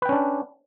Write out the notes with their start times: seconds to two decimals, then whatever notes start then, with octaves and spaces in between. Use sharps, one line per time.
0.02 B4
0.05 G5
0.09 C#4
0.12 D4